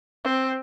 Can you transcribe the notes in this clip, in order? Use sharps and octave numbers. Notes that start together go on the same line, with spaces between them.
C4